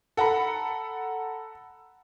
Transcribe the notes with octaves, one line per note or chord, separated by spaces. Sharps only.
A4 F#5 A#5 B5